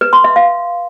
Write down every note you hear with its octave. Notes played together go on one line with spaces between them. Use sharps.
B4
C6
E5
F5